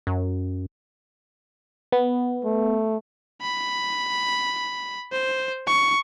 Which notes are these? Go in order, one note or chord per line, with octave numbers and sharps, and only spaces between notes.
F#2
B3
A3
B5
C5
C#6